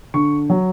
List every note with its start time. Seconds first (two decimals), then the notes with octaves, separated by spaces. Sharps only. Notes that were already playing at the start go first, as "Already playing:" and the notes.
0.14 D3 C#6
0.50 F#3